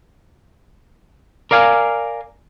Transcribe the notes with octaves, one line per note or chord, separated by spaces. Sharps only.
A#4 D5 F5 G#5